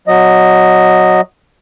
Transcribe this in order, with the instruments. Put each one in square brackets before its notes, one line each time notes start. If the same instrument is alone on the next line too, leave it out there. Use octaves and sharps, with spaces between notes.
[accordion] F#3 D#5